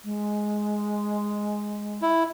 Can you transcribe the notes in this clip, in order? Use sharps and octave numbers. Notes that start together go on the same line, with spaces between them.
G#3
E4